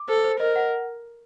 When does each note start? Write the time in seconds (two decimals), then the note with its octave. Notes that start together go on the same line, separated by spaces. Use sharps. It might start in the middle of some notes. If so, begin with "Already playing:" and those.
Already playing: D6
0.08 A4 C5
0.24 C5
0.40 A#4 D#5
0.56 F#5